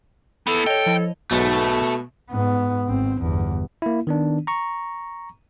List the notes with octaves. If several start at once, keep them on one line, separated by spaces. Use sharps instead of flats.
B3 E4 A4
C#5 D#5 G5
F3 E4 D#5
B1 G#2 B2 A3 F#4
G#2 B3
G#1 C4
G1 E2
A#3 E4
D#3 B3 D4
A#5 C#6